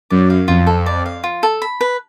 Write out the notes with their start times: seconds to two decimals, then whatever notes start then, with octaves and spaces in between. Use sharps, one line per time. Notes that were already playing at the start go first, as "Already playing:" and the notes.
0.10 F#2 D5
0.30 F5
0.48 F2 F4
0.67 A4
0.86 D5
1.06 F5
1.24 F4
1.43 A4
1.62 B5
1.81 B4